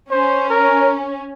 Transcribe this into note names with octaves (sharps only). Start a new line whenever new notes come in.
C#4 C5
A#4